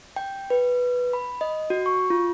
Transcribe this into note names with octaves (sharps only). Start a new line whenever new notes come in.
G5
B4
B5
D#5
F#4
C#6
F4